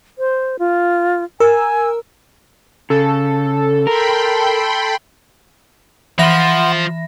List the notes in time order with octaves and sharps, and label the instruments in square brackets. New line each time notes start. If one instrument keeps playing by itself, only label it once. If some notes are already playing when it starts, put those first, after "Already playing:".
[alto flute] C5
F4
[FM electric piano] A#4 E6 [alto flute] G#5
[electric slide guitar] C#3 [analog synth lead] A4
[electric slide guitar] A#4 [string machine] G5 B5 C6
[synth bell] E3 E5 A#6 [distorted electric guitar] F3 [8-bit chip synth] F#5 C6